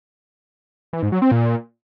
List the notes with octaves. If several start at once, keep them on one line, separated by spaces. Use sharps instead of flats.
E3
G#2
F#3
C4
A#2